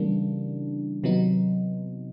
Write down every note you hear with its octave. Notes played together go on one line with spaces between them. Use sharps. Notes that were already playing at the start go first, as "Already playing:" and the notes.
Already playing: C#3 E3 G3 A#3 D4
C3 D#3 F#3 B3 D#4